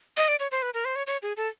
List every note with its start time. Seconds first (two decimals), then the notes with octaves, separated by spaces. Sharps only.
0.17 D#5
0.28 D5
0.40 C#5
0.51 C5
0.62 B4
0.74 A#4
0.85 C5
0.96 C#5
1.07 C#5
1.23 G#4
1.37 A4